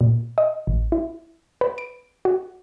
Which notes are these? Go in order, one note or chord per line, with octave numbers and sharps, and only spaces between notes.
A#2
D#5
A1
E4
B4
D7
F#4